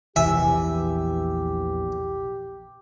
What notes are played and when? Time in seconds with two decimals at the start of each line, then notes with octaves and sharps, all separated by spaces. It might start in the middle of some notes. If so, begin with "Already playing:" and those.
0.16 A#1 E2 E3 G4 E5 G#5